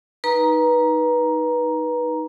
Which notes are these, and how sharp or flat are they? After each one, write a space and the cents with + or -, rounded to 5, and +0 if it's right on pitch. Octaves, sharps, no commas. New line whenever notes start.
D#4 +0 B4 -20 A#5 +10